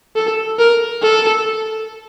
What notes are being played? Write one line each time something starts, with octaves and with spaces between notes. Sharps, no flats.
A4
A#4
A4